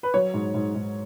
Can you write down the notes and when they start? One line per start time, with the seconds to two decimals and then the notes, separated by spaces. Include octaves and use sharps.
0.03 B4
0.14 F#3 C#5
0.34 G#2
0.54 G#2
0.75 G#2